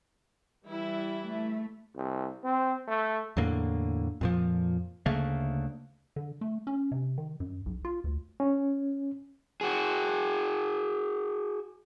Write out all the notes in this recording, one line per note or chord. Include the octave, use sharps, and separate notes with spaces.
E3 G3 E4
A3
C2
C4
A3
E2 A2 D3 A#3
F2 A#2 F3
D2 C#3 A3 A#3
D3
A3
C#4
C3
D#3
F#2
B1
F4
D2
C#4
F#4 G#4